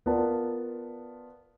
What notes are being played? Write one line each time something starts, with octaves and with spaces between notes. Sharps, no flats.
B3 F4 A#4 B4 D5 A5